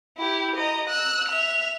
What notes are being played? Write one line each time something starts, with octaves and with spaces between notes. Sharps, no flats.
E4 G4
D#5 A#5
E6 F#6
E5 F7